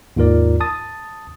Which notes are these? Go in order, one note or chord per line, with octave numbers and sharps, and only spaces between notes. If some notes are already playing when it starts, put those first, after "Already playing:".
D#2 G#2 F4 A#4 D5
A5 D#6 A6